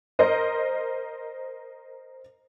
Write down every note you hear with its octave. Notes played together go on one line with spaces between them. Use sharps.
A#4 C5 D#5